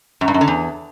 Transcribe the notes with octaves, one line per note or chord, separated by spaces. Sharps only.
F#2
G2
F#2
D3
E2